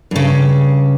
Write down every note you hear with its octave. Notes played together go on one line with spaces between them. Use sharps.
G2 C#3